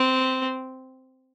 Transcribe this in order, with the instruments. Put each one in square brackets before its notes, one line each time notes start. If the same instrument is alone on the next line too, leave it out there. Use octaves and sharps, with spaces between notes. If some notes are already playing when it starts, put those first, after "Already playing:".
Already playing: [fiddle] C4